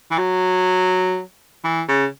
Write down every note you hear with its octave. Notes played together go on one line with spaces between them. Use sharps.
E3
F#3
E3
C#3